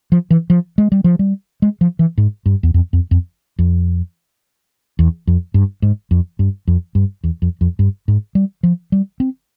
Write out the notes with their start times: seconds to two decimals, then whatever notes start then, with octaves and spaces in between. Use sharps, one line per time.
0.12 F3
0.31 E3
0.50 F3
0.78 G#3
0.92 G3
1.04 F3
1.19 G3
1.62 G#3
1.81 F3
1.99 E3
2.18 G#2
2.46 G2
2.63 E2
2.74 F2
2.93 F2
3.11 F2
3.59 F2
4.99 E2
5.27 F2
5.54 G2
5.82 G#2
6.11 F2
6.39 G2
6.68 F2
6.95 G2
7.24 E2
7.42 F2
7.61 F2
7.79 G2
8.08 G#2
8.35 G3
8.63 F3
8.92 G3
9.20 C4